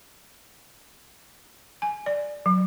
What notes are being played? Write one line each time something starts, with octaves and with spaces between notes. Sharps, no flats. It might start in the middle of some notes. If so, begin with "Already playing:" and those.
G#5
D5
F#3